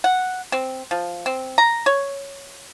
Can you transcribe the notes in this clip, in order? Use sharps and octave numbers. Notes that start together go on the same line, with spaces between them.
F#5
C4
F3
C4
A#5
C#5